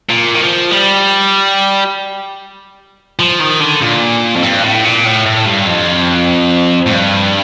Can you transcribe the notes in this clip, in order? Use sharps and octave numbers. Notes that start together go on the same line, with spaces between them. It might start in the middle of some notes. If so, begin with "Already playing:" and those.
A#2
D#3
F3
G3
F3
D#3
D3
A#2
F2
G2
A2
A#2
A2
A2
G2
F2
A2
G2